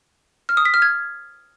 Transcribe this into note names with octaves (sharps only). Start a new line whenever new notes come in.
F6
D#6
B6
F6
G#6